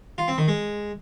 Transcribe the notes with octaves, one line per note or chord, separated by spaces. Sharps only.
F4
C4
D#3
G#3